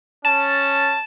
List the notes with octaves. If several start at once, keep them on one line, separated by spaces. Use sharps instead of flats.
C#4 A5 E7